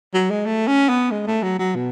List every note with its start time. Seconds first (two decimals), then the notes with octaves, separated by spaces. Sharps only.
0.14 F#3
0.30 G#3
0.46 A3
0.67 C#4
0.89 B3
1.11 G#3
1.27 A3
1.43 F#3
1.59 F#3
1.75 B2